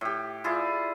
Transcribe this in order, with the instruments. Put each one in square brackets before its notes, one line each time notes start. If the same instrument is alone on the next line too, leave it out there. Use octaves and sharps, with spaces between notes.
[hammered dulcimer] A2 G4
E4 F4 G#4 D5